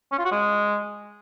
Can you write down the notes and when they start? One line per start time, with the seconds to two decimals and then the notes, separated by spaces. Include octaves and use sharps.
0.12 C#4
0.19 F4
0.25 F#4
0.32 G#3